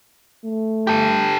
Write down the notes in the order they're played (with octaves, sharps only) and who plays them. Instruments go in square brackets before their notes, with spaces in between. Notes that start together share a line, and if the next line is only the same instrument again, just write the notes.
[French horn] A3
[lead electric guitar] G4 A4